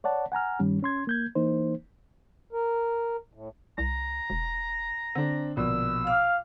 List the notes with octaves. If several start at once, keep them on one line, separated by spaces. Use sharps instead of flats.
C#5 D5 F#5 A5
F#5 G#5 A#5 F6
G2 D#3 G3 C#4
C#4 C6 G#6
A#3 G6 G#6
E3 A#3 D#4 C5
A#4
A2
C2 A#5
E1
D3 C4 D4
A#1 B2 E6
F5 D6 F6